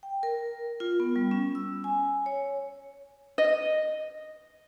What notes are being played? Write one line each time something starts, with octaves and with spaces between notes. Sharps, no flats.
G5
A#4
F4
B3
G3
C#4
E6
G#5
C#5
D#5